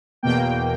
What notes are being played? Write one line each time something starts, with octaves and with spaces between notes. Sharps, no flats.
E2 B2 A#3 G5